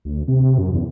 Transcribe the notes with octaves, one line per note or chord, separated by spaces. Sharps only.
D2
C3
F#2
E2